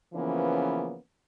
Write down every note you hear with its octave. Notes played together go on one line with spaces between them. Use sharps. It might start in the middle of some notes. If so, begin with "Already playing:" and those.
C#3 E3 F3 A#3 B3 C#4